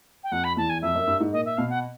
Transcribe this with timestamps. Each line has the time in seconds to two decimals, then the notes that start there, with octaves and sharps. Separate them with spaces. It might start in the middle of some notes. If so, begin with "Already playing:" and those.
0.24 G5
0.32 F2 F#5
0.44 B5
0.57 E2 A5
0.69 G#5
0.82 F2 E5
0.95 F#2
1.07 G2
1.20 G#2
1.32 A#2 D#5
1.45 E5
1.57 B2 F5
1.70 F#5